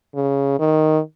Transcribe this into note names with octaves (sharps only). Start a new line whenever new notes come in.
C#3
D#3